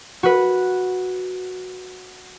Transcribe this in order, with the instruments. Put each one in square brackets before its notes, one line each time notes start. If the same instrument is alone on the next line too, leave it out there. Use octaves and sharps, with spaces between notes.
[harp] F#4 B4